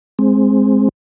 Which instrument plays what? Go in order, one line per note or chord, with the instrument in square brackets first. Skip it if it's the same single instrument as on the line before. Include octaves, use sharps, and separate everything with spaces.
[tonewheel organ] G#3 C4